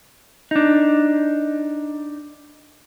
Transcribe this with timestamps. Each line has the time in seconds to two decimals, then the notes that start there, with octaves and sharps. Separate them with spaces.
0.51 D4 D#4